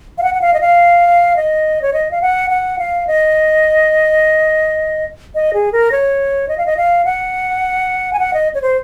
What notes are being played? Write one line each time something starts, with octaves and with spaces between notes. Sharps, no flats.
F5
F#5
F#5
F5
D#5
F5
D#5
C#5
D#5
F5
F#5
F#5
F5
D#5
D#5
G#4
A#4
C#5
D#5
F5
D#5
F5
F#5
G#5
F#5
D#5
C#5
C5